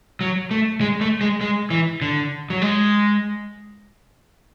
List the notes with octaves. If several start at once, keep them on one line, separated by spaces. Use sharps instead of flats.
F#3
A3
G#3
A3
G#3
G#3
E3
D3
F#3
G#3